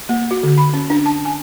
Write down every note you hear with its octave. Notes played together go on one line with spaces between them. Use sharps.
A#3
F#4
D3
B5
C#4
D4
A5
G#5